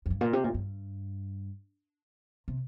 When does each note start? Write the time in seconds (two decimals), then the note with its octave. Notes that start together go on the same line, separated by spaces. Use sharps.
0.06 F2
0.10 G2
0.21 A#2
0.33 C3
0.44 A#2
0.54 G2
2.48 C3